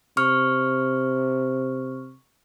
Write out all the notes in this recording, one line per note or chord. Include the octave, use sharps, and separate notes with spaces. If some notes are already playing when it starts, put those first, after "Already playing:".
C3 C#6 F6